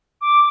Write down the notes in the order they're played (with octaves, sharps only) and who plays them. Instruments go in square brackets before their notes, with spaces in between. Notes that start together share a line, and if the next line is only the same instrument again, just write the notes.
[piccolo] D6